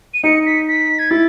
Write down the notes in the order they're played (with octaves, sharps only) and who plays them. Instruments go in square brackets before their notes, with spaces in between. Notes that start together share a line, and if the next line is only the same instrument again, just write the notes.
[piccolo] D#7
[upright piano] D#4 [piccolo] C#7
[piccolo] B6
B6
G#6
[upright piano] E4 [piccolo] A6